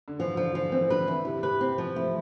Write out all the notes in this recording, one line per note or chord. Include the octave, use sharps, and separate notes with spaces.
D3
E3 F3
D3 F3
D3 F3
E3 C4
E3
D3 B4
E3 E4
C3 E4
C3 B4
C4
E3 F3
A3 E4